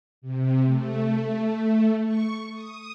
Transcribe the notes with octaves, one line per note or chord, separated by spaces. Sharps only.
C3
A3
C#6
D#6